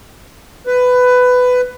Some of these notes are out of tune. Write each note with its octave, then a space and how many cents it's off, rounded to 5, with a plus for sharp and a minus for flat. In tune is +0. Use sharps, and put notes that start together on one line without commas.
B4 +15